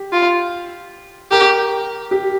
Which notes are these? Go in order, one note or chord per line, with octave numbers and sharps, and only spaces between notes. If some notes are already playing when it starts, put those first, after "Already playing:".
Already playing: G4
F4
G4 A#4
G4